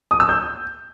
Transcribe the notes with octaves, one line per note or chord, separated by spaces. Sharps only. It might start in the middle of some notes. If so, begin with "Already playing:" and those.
D#6
E6
G6